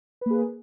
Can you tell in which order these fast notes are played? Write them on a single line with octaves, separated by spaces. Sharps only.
B4 A#3 G#4